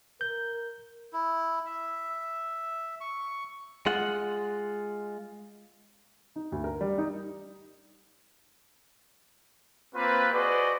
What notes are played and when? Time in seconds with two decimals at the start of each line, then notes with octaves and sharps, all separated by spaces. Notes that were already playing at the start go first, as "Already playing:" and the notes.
0.21 A#4 G6
1.13 E4
1.66 E5
3.01 C#6
3.86 G#3 F4 F#5
6.36 D#4
6.52 D2
6.64 A#4
6.81 G3
6.98 D#4
9.95 A#3 C4 F4 B4
10.33 F#4 G#4 B4 C5 D5 D#5